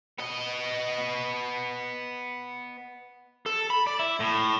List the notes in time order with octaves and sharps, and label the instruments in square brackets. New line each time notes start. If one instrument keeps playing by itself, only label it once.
[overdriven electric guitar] B3 D#5
A4
B5
D5
E4
A2